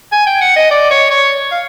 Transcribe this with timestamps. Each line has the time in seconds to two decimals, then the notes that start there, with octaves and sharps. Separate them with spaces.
0.12 G#5
0.27 G5
0.41 F#5
0.56 D#5
0.71 D5
0.91 C#5
1.10 C#5
1.52 F5